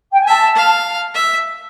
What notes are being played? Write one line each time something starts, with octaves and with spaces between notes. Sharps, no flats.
G5
G#5
E5 A5
F5
E5